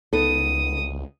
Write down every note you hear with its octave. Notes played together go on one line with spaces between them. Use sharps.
C#2 B3 D#4 A4 D#6